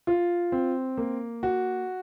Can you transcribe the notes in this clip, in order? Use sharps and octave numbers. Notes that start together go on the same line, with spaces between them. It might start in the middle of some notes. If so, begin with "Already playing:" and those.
F4
C4
A#3
F#4